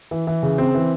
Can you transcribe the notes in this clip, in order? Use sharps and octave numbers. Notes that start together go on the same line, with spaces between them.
E3
E3
C#3
C4
E3